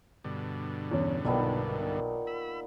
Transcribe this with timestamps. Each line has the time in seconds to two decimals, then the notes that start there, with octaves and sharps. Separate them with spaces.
0.24 G2 B2 D3
0.91 E2 C#4 C#5
1.25 B1 A#2 D#3 B3
2.27 B5 E6